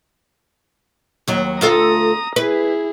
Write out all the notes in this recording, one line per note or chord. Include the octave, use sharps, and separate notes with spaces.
D#2 F#3
D2 F4 A4 A#5 D#6
E4 G#4 B4